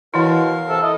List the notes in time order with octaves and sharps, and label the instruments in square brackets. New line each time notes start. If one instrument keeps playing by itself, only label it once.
[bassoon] B2 [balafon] E3 E4 [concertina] A#4 F5
[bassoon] C3 [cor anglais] A4
[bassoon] E4 [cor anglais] D#5